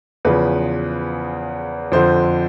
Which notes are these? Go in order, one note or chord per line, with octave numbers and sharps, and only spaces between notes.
E2 C#3 F3 B4
F2 D3 F3 C5